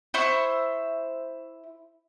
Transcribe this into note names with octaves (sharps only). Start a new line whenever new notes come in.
E4 C5 E5 C#6